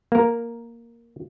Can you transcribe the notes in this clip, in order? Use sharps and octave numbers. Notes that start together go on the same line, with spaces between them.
A#3 A#4